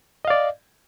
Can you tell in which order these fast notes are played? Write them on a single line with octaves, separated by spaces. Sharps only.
D#5 F5 D5